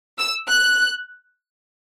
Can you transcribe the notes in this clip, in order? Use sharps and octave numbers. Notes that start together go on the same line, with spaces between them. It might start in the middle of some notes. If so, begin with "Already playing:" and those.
E6
F#6